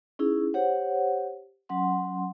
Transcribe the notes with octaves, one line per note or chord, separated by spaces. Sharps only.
C#4 D#4 E4 G#4
G4 C5 C#5 F#5
F#3 C#4 F#5 C6